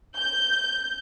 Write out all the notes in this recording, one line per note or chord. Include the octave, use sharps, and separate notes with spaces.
G6